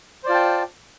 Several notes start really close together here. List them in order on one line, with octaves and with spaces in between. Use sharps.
C5 D5 F4 A5 G5